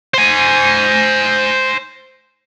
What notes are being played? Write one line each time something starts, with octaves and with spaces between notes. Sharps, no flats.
C5 G#5